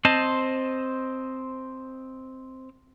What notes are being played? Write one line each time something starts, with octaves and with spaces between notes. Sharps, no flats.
C4 C5 D#5 A5